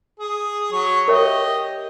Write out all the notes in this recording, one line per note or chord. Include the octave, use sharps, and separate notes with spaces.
G#4
F#3 C#5
G4 A#4 C#5 D#5 E5